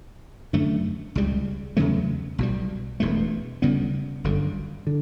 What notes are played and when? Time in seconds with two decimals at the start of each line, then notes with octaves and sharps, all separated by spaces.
0.53 F#2 D3 A3
1.15 C#2 C#3 G3
1.77 E2 C#3 F#3 A3
2.38 B1 B2 G3
3.00 E1 E2 B2 A3
3.62 D2 C#3 G3 B3
4.24 G1 F#2 D3
4.87 D3